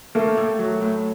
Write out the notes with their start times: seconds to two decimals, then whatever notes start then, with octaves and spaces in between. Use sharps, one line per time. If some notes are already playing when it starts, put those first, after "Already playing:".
0.15 A3 A#3
0.37 A2
0.59 F#3
0.81 A2